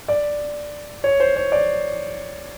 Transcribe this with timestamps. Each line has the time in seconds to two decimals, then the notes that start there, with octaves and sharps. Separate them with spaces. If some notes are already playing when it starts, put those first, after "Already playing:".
0.08 D5
1.04 C#5
1.20 C5
1.36 C#5
1.52 D5